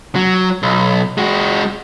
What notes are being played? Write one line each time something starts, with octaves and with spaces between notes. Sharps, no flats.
F#3
B1
G#3 F#4